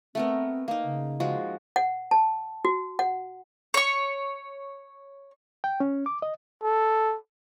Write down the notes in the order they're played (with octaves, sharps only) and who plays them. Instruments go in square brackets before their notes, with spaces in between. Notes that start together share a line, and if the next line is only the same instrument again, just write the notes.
[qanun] A3 B3 A#4 [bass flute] C4
[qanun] A#3 D#4
[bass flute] C#3
[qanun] F3 G#3 F#4
[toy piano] F#5
A5
F#4
F#5
[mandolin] C#5 C#6
[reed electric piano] G5
C#4
D6
D#5
[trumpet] A4